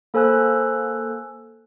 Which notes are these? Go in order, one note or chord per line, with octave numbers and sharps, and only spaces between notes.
A#3 A4 C5 G#5 E6 F#6